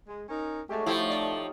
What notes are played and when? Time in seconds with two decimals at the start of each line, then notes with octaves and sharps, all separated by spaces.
0.08 G#3
0.29 C#4 D#4 A#4
0.69 G#3 A3 C#4 F#4 G4
0.86 A2 F3 A3 D#4 E4 G4 C#5 G5
1.10 D#4 G4 A4 D5